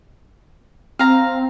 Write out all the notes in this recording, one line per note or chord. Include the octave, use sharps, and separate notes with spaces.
C4 F5 A#5